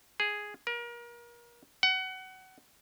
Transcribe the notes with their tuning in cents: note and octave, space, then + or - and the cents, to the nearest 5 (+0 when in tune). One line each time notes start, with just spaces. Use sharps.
G#4 +0
A#4 +30
F#5 +25